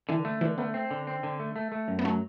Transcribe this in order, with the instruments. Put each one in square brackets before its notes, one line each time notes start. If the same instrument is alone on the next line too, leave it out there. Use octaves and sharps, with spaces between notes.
[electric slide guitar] D3 [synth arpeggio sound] E3
[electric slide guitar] A3
[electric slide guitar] D3 [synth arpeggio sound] E3
[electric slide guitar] A3 [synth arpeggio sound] B3
[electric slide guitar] C4
D3
C4
D3
A3
A3
A3
F#2
[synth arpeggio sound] B3
[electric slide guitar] F#3 [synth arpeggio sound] A3